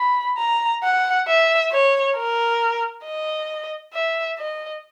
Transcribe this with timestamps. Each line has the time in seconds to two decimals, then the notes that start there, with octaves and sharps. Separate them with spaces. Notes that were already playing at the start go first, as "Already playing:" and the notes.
Already playing: B5
0.38 A#5
0.83 F#5
1.28 E5
1.72 C#5
2.16 A#4
3.05 D#5
3.94 E5
4.38 D#5